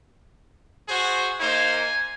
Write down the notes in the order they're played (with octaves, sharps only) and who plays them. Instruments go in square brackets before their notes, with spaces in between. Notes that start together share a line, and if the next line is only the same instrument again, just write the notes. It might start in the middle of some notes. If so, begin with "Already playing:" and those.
[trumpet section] F#4 G#4 C5
[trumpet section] A#3 D#4 C5 [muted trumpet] G#5